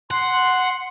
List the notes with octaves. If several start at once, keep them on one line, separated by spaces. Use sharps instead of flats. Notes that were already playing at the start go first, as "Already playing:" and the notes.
F#5 C6